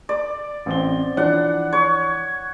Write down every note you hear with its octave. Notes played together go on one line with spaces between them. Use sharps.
D5
A1 C4 G7
E3 F3 D4 F#5
C#5